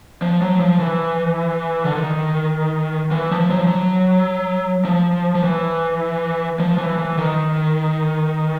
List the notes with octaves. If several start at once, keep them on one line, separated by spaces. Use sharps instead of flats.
F3
F#3
F3
E3
D3
D#3
E3
F3
F#3
F3
F#3
F3
F3
E3
F3
E3
E3
D#3